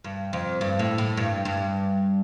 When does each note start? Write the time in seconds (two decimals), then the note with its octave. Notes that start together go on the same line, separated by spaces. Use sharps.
0.04 G2
0.33 F2
0.61 G2
0.79 A2
0.98 A2
1.17 G2
1.45 G2